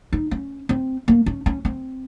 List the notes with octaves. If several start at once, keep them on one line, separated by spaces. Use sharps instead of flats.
D#4
C#4
C4
A#3
C#4
C#4
C4